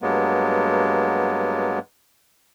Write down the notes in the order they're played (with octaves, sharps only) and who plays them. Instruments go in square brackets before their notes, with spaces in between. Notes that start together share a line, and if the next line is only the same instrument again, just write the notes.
[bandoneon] G2 F#3 G#3 A#3 B3